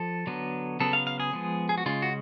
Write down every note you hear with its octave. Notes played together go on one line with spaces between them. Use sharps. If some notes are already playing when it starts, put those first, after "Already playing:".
Already playing: F3 A4
D3 F#3 B3
C#3 F#3 B3 A4
F5
F5
G#4
F3 G#3 B3
G#4
F#4
C#3 G#3 C#4 F4
F#4